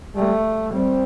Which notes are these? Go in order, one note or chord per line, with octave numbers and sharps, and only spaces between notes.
G3 A3
G3 C4